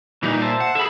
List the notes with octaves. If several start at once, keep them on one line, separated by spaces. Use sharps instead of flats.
A#2 E3 G3 D#4
C5 E5 A5
F#5
G#4 A4 E5 B5